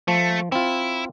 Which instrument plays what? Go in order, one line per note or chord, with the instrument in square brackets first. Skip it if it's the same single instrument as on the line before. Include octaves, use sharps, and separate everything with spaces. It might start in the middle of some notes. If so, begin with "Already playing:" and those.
[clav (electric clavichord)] F3 [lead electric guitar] A3
[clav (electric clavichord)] C4 F4 [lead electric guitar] E4